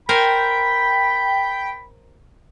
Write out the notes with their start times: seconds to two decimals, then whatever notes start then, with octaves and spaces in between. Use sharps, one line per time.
0.09 A#4 C5 G5 G#5 B5